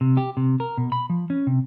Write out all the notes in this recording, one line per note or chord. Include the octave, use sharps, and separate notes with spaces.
C3
G4
C3
A#4
B2
B5
F3
C#4
C3